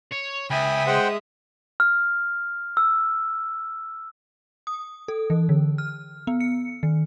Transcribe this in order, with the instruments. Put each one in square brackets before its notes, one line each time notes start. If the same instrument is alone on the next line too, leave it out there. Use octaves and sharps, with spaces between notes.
[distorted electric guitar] C#5
[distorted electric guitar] C#2 [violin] E5 D#6 [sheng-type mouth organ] G5 G#5 B5
[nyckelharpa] G#3 [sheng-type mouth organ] C5 F#5 G5
[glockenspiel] F6
E6
[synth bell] D#6
A4
E3
D3
F6
B3
C#7
D#3